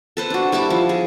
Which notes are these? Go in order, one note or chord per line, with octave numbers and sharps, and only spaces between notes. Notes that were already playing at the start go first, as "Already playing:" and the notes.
A4 B4 C5
D4 F#4
G3 E4 A5 D6
F3
G#4